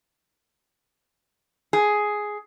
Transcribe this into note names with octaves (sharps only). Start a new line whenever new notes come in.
G#4